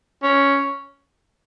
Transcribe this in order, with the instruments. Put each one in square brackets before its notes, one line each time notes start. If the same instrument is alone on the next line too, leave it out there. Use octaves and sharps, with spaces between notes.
[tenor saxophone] C#4